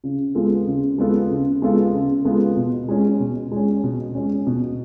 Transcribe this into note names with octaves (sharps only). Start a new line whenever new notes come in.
C#3
G#3 B3 F4 A4
C#3
G#3 B3 F4 A4
C#3
G#3 B3 F4 A4
C#3
G#3 B3 F4 A4
B2
G#3 C#4
B2
G#3 C#4
B2
G#3 C#4
B2